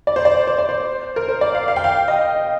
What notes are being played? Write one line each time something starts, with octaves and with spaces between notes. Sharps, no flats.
D5
C5
D5
C5
D5
C5
A#4
C5
D5
F5
F5
G5
F5
D#5